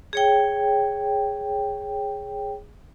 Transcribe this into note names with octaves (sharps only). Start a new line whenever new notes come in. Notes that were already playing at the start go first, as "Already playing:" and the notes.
G#4 C#5 G5